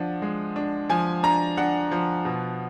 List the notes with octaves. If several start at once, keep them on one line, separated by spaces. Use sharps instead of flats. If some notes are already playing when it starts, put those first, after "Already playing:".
Already playing: F3 D4 F#5
G#3
D4
F3 G#5
D4 A#5
D4 F#5
F3
B2